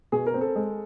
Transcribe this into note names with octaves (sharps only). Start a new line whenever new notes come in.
B2 G#4
A#4
C4
A4
G#3